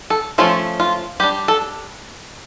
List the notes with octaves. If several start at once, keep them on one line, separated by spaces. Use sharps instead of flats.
A4
F3 A3 C#4 F4
F4
G3 D4 G4
A4